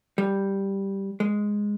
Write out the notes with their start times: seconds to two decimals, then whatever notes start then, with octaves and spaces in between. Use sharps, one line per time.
0.18 G3
1.20 G#3